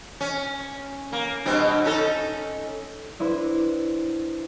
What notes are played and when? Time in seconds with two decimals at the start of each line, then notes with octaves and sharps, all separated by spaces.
0.21 C#4
1.13 A#3
1.45 G2 B2 C4
1.84 C#4 D#4 A4
3.19 D4 E4 B4 C5